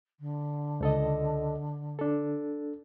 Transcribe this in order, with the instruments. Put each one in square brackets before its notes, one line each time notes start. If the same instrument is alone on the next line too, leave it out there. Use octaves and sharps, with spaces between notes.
[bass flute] D3
[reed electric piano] C#2 A4 D#5
D4 A4